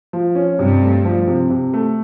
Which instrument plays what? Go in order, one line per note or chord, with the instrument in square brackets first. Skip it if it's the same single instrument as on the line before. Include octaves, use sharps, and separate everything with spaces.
[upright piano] F3
C#4
[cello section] G2 [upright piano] C3
[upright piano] A3
F3
C3
C3
A3